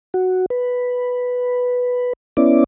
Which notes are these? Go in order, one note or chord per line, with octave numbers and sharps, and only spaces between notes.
F#4
B4
B3 C#4 E4 D5